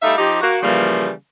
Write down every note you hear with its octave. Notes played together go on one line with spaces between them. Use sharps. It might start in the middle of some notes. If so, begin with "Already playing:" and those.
G3 A3 D#4 E5 F5
F3 D#4 G4
A#3 F#4
C#3 E3 F3 G3 A#3